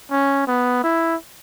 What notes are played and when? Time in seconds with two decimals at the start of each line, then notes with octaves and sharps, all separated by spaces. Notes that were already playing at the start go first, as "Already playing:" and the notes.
0.11 C#4
0.47 B3
0.84 E4